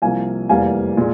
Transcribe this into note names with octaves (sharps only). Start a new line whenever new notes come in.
C2 C3 F3 A#3 F5 G#5
F1 E2 E3 G3 A#3 F5 G#5
A#2 G#3